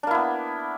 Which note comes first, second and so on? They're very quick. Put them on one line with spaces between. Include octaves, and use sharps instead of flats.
D4 A#3 E4 B3